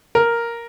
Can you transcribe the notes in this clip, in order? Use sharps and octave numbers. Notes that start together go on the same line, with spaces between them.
A#4